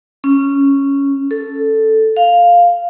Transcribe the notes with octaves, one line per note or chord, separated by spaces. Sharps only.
C#4
A4
F5